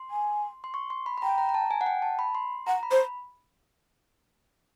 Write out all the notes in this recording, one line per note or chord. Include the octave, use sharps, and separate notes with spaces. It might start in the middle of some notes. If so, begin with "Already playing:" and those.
Already playing: C6
G#5
C6
C#6
C6
B5
B5
G5 A#5
A#5
A#5
A5
G#5
F#5
G5
A5
B5
C6
F#5 A#5
B5
C5